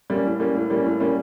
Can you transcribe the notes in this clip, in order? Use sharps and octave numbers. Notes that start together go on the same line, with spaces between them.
G3 A#3 C#4
A2
G3 A#3 C#4
A2
G3 A#3 C#4
A2
G3 A#3 C#4